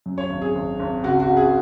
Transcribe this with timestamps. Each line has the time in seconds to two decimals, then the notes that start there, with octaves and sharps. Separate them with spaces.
0.06 F#2
0.18 C#5
0.30 G#1
0.42 G#4
0.55 G#1
0.79 G#1
1.03 C#2 F#4
1.20 F#4
1.28 C#3
1.37 G#4